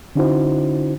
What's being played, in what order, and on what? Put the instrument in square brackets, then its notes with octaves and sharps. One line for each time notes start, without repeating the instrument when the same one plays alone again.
[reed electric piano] D3 C#4 D#4 E4 F#4 C5